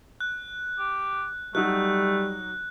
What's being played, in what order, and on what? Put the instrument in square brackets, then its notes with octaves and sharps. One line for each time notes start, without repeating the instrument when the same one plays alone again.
[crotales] F#6
[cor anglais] G4
[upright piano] F#3 D#4 F#4 [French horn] G3 [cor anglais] A3 [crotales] F#6